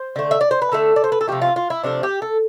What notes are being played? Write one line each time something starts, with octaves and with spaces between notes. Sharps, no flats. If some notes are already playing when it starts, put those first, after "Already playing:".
Already playing: C5
D3 A3
E5
D5
C5
B4
D3 A3 A4
D5
C5
B4
A4
C3 F3 A3 G4
F4
F4
E4
C3 F3 A3 D4
G4
A4